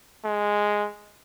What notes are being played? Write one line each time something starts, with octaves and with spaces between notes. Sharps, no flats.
G#3